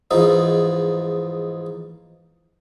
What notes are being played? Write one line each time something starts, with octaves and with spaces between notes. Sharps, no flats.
E2 G#2 F3 D#4